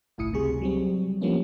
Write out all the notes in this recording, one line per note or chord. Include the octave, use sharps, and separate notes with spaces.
G1 C2 A2 E4 D#6 C#7
C#2 C3 G3 G#4 C#6
F#3 G3 C4
F3 G3 A#3 B3 C#4 D4